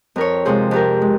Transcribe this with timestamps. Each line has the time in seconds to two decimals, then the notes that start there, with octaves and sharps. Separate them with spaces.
0.16 F2 A#4 C#5
0.45 C3 F3 G#3 G#4 C5
0.71 F2 G4 A#4
1.01 G#3